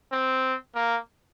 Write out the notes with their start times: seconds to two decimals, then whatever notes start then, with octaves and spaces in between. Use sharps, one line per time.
0.12 C4
0.75 A#3